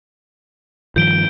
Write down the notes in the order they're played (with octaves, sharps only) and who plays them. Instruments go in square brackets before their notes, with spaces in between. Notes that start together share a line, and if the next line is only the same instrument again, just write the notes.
[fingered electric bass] G2 D#3 F3 [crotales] G6 D7 G7